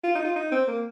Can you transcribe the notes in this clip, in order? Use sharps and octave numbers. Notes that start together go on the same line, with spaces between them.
F4
D#4
F4
D#4
C4
A#3